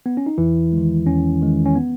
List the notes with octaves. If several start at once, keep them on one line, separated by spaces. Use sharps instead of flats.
B3
C#4
D#4
E2 E3 E4
D#3 G#3
E2 C#4
D#3 G#3
C#4
B3